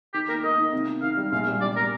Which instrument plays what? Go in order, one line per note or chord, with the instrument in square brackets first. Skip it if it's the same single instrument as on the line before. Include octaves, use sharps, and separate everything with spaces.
[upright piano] D#3 [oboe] G4
[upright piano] A#3 [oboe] A#4
[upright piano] A#3 [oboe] D#5
[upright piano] D#3
C2
D#3
[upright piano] D#3 [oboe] F5
[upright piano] G3
[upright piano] A#1 [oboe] F5
[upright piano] G3
[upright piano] G3 [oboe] D5
[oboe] A#4